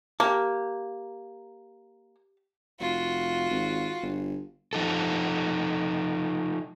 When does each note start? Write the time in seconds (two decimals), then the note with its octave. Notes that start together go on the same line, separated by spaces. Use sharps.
0.20 A#3 G4 A5
2.80 F1 F4 F#4
3.51 G#1
4.02 G1
4.73 F3 D#4 A4